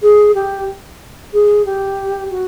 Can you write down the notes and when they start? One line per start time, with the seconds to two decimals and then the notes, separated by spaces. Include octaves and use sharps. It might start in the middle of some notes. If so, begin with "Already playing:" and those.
0.02 G#4
0.35 G4
1.33 G#4
1.66 G4
2.31 F#4